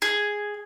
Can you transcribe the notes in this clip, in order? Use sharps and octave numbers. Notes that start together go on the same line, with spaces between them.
G#4